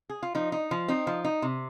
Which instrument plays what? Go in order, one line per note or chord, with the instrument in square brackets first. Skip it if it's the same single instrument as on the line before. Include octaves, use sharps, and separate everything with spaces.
[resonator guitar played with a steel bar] G#4
F4
F3 D#4
D#4
F3
C4 D#4
F3
D#4
C3